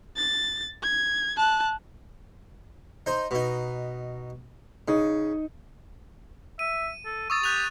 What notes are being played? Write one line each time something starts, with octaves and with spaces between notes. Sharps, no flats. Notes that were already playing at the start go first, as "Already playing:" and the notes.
A6
G#6
A5 F#6
D#4 C5
B2 D#4
C#3 D#4 D#5
E5 D#7
A4
C#6 D#6 E6 A6
G4 F#6 A6 F7